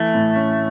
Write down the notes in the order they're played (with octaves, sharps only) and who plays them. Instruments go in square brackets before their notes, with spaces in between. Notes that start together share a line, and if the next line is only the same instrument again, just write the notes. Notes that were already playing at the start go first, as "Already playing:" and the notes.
Already playing: [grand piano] E3 [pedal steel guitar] A3
[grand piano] A2
C#4